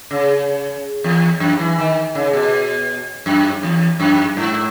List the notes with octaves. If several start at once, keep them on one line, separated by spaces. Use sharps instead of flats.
C#3
E2
F#2
E3
D#3
C#3
B2
F#2
E2
F#2
G#2